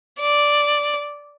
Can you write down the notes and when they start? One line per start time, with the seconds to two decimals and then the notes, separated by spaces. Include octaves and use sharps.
0.20 D5